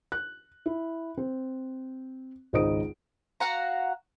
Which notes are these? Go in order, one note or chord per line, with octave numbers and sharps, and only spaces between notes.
F#6
E4
C4
G#1 C#2 D#4 C5 D#6 D7
F#4 F5 F#5 A#5